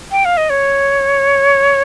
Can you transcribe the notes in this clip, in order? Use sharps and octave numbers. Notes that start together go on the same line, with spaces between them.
G5
F5
D#5
C#5